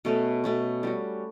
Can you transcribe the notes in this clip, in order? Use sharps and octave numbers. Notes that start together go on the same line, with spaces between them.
B2 A3 C#4
B2 A3 C#4
G3 C#4 F#4